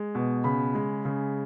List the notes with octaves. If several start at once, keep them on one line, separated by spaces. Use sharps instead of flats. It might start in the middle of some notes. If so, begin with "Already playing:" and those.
Already playing: G#3
B2
C#3 B5
G#3
C#3